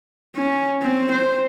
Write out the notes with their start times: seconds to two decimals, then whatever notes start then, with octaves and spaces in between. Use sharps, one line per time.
0.35 C#4
0.82 C4
1.12 C5